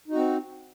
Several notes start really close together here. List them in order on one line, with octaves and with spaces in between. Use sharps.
D#4 F#4 C4